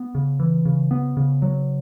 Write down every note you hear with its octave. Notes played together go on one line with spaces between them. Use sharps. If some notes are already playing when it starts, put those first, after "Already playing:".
Already playing: B3
C#3
E3
C#3
B3
C#3
F#3